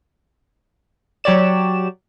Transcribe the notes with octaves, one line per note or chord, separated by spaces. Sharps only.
F#3 G4 C#5 D5 E7